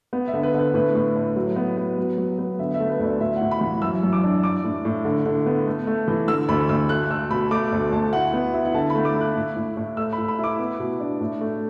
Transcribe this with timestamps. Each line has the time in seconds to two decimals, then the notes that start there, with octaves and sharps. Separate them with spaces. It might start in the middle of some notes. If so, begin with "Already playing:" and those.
0.13 B3
0.28 E5
0.33 D3
0.43 B4
0.54 D3
0.59 B4
0.74 A2 B4
0.95 A2
1.16 A2
1.36 F#3
1.56 B3
1.77 B3
1.97 F#3
2.18 F#3
2.39 B3
2.59 D3 E5
2.74 E5
2.80 A3
2.90 B4
3.00 D2
3.05 D5
3.20 A2 E5
3.36 F#5
3.41 A2
3.51 B5
3.61 E3
3.82 F#2 E6
4.03 F#2
4.13 D6
4.23 D4
4.44 D4 D6
4.64 A2
4.85 A2
5.05 D3
5.25 D3
5.46 B3
5.67 A3
5.87 A3
6.08 E3
6.28 D3 E6
6.48 D2 B5
6.69 D2 E6
6.89 A3 F#6
7.11 A3 E6
7.30 B2 B5
7.51 A3 D6
7.72 D2
7.92 D2 A5
8.13 E4 F#5
8.33 B3
8.54 E4
8.65 F#5
8.74 D3 A5
8.90 A3 B5
9.05 D6
9.15 E4
9.21 F#6
9.35 A2
9.56 A2
9.77 A2
9.97 A3 E6
10.13 B5
10.18 A2
10.28 B5
10.39 E4 D6
10.59 B3
10.79 B2
11.00 D4
11.20 A2
11.41 A3